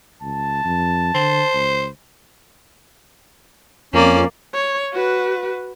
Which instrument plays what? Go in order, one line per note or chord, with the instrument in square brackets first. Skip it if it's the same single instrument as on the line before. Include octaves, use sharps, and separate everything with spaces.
[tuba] C#2 [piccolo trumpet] A5
[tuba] F2
[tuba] D3 [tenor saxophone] C5
[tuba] C#2
[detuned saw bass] F2 [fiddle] A#3 D5 [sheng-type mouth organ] C#4
[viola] C#5
F#4 B4